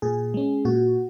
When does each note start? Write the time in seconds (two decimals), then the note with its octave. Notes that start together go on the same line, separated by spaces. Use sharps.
0.02 A#2 G#4
0.34 G#3 C#4
0.65 A#2 F#4